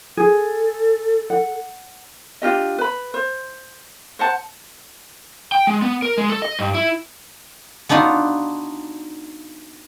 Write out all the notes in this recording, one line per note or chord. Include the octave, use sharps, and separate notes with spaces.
G#4 A4
F#5
D4 F4 G4 D#5
B4 B5
C5
C5 F#5 A5
G5
G#3
B3
A#4
G#3
A4
D#5
G2
E4
B3 D4 D#4 F4 F#4